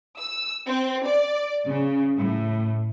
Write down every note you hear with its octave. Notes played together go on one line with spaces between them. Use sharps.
E6
C4
D5
C#3
A2